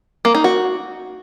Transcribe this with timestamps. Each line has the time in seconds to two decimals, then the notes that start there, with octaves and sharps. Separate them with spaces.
0.25 A#3
0.35 D#4
0.44 F#4